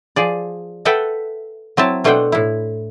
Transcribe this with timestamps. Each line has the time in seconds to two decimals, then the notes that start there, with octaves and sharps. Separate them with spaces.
0.16 F3 G#4 D5
0.85 A4 B4 E5 F#5 G5 A5
1.77 F#3 C4 E4 A5
2.04 B2 A3 D4 C5 F#5 G5
2.32 A2 E4